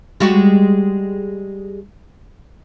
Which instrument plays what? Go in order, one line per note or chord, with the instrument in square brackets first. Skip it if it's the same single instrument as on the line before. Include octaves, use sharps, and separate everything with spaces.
[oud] G3 G#3 F#4